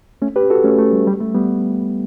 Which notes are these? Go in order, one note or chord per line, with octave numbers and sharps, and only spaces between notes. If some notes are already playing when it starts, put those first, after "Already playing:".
A3 C#4
G4 B4
F#4 A4
A3 C#4
A3
G3
G3
A3
G3 B3